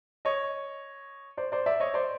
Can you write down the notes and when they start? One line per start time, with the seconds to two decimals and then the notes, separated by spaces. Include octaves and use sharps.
0.25 C#5 D#5
1.37 C5 D5
1.52 C5 D5
1.66 D5 E5
1.80 C#5 D#5
1.94 C5 D5